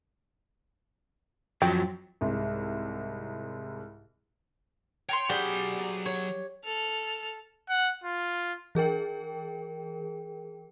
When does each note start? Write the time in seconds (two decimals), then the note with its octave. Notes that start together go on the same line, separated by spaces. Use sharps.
1.62 F#2 F3 F#3 G5
2.21 C2 G#2
5.09 C#5 G5 A#5 C6
5.29 F#3 C#4 G4 G#4 C5 D5 F#5 B5
6.06 C#5
6.65 A4 F6
7.69 F#5
8.04 F4
8.75 E3 G#4 A#4 G5